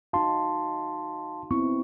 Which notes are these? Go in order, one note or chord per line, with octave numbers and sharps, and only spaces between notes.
D#4 F#4 F5 A5 C6
B3 C4 E4 C#6